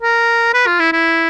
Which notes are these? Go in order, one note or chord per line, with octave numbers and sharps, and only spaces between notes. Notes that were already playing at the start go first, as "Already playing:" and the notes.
A#4
B4
F4
E4
E4